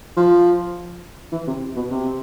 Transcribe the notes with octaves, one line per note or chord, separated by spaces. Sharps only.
F3
E3
C3
B2
C3